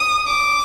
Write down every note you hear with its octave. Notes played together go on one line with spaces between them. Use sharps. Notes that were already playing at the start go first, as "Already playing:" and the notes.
Already playing: D#6
D6